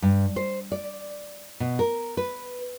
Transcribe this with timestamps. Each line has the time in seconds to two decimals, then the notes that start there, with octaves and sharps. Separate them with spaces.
0.02 G2
0.36 C5
0.72 D5
1.60 B2
1.79 A#4
2.17 B4